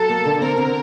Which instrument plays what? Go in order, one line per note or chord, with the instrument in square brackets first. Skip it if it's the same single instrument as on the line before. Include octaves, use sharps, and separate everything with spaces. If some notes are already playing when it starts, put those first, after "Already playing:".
Already playing: [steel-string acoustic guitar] F#3 [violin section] A4
[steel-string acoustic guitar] A#3
D3
[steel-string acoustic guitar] C4 [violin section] A#4
[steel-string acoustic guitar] D3